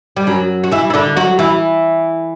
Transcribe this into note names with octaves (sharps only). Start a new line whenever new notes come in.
G3
F#2 F#3
F#4
E3 E4
E4
D3 D4
F#3 F#4
E3 E4